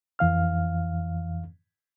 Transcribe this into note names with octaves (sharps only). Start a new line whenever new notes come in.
F2 E3 F5 F6